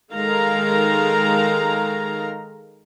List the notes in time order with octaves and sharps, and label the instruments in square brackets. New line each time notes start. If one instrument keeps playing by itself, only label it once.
[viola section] D#3 G#3 A4 A#4 F5 A#5